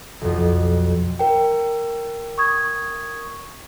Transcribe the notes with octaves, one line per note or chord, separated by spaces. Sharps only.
B1 F2
A#4 G5
C#6 D#6 G#6